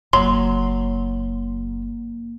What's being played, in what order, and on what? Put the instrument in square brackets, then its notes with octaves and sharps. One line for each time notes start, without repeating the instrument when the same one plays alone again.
[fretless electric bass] F#1 F#2 [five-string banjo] F#3 [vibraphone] A#3 [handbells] C6